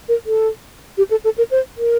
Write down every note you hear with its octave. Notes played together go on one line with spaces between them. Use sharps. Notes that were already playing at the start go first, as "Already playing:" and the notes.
A#4
A4
G4
A4
A4
A#4
C5
A#4